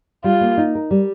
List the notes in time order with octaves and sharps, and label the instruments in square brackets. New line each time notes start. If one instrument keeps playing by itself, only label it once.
[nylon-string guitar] G3 [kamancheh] F4
[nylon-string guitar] A#3
D#4
A#4
G3